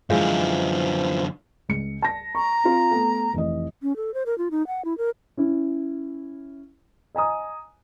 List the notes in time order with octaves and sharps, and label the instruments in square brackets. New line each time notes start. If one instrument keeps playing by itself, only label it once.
[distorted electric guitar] F#2 D3 [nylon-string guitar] E3 F3 G#3
[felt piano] C#2 C#7
A5 A#6
[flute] A#5 [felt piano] C#6
[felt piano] C4 F4
A3 B3
F1 E3 D#5
[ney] C#4
A4
C5
A#4
F4
D#4
F#5
E4
A#4
[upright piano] C#4 E4
D#5 G#5 A#5 D#6